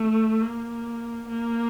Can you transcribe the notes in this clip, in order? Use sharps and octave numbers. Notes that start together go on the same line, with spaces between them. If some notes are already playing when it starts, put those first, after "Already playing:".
Already playing: A3
A#3
A#3